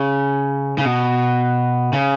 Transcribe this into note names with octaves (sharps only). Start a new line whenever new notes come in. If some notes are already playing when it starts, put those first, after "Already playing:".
Already playing: C#3
C#3
B2
C#3